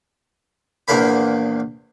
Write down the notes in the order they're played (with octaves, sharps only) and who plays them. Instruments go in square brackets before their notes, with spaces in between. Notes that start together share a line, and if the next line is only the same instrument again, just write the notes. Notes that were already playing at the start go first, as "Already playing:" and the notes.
[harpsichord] A#1 E2 A#3 A#4 B5